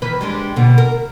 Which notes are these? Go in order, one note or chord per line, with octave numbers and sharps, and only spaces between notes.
D#3 E3 B4
G3 G#3 D4
B2 D3
A#4